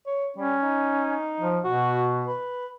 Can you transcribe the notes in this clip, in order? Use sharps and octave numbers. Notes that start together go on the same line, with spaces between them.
C#5
G3 C#4
D#4
F3
B2 F#4
B4